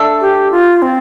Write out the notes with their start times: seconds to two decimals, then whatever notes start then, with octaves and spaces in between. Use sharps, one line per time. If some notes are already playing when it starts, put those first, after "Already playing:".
Already playing: A3 D4 A4
0.21 G4
0.51 F4
0.82 C4